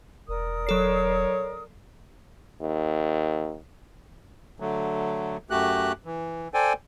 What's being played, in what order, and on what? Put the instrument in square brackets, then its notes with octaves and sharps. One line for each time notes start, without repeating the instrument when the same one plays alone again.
[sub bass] E1 [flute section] A#4 D5 D#6
[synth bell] F#3 A4 C7 [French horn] C#5
[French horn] D#2
[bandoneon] D3 F#3 A3
F#2 A3 F#4 G4 F#6
E3
A4 C5 D5 G5 G#5